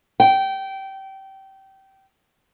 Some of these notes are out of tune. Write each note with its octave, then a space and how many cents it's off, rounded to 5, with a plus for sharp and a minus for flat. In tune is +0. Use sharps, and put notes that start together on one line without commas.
G5 -20